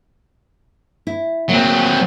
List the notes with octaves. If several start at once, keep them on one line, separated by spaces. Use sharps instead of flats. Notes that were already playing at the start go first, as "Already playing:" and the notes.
E4
D2 F#3 A#3 C4